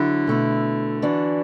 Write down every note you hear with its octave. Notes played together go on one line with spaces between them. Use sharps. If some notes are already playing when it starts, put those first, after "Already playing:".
Already playing: D3 F#3 E4
B2 A3 E4
E3 D4 F#4